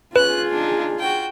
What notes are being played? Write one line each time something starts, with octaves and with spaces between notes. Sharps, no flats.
C#4 F4 G#4 B4 F#6
D4 D#4
F#4 G5